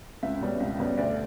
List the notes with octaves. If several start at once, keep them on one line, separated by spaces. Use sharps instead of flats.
C#2 E5
B2 G3 C#4
C#2
B2 G3 C#4
D2 D5